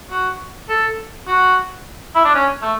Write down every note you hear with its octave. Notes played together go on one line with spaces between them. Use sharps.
F#4
A4
F#4
E4
D4
C#4
A3